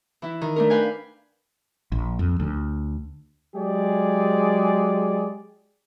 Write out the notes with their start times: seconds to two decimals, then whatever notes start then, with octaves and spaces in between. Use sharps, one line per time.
0.22 E3 E4
0.41 D#3
0.56 A3 D4 A#4
0.70 B4 F5 G5 G#5
1.92 A#1
2.19 F2
2.40 D2
3.55 F#3 G#3 G4 G#4 D5